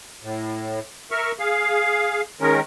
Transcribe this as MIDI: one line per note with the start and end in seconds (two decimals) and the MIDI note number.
0.23 0.80 45
1.11 1.32 70
1.11 1.32 76
1.11 1.32 85
1.11 1.32 89
1.39 2.21 68
1.39 2.21 77
2.41 2.60 51
2.41 2.60 56
2.41 2.60 61
2.41 2.60 70